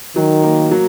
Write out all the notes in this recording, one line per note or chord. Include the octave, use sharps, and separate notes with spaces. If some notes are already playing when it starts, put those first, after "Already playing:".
D#3 F#3
A#3
F#3